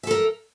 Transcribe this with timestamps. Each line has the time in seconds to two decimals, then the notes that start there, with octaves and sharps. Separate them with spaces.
0.03 E5
0.07 A4
0.11 A#4